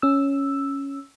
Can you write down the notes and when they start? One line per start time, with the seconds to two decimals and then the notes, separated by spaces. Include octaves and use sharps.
0.02 C#4 E6